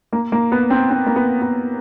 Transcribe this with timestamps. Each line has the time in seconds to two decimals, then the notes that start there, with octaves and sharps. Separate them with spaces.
0.13 A#3
0.32 A#3
0.52 B3
0.70 C4
0.90 C4
1.06 A#3
1.16 B3
1.42 B3